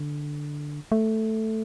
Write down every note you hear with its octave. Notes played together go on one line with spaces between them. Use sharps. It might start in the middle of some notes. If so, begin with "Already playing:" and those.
Already playing: D3
A3